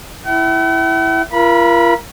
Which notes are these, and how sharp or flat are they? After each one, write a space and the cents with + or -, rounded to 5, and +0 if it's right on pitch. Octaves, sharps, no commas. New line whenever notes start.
E4 +0 F#5 +45
F4 -35 A#4 +25 B5 -20